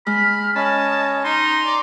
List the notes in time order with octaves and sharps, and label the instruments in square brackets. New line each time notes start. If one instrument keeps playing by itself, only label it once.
[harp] G#3 [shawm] B5 [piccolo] F6
[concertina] C#4 [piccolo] D#5 [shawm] A5 [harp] B5
[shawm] D#4 [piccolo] A#5 [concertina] C6
[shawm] D5